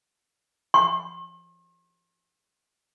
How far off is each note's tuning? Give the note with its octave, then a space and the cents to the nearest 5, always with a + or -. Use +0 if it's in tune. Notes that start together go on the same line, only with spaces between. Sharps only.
C6 +45